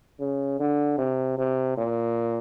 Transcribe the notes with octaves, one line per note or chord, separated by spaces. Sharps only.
C#3
D3
C3
C3
A#2